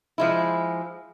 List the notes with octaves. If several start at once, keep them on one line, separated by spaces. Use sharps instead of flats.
F3 G#3 E4